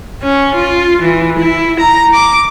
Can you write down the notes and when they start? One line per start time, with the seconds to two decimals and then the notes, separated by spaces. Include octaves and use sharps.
0.22 C#4
0.55 F4
1.02 E3
1.39 E4
1.79 A#5
2.14 D6